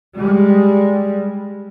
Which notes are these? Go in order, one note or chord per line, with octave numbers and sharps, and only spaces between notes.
G3 G#3